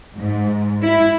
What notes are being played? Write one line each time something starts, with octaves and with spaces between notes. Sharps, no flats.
G#2
E4